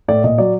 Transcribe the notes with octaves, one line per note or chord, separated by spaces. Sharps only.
A2 D5
A#2 D#5
F#3 D5